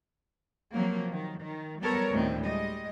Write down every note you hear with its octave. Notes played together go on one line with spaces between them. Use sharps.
C3 F3 F#3 A#3
D#3
D#3
F#3 G3 B3 A4 A#4 C#5
D2 A2 D#3 C4
G3 G#3 D#5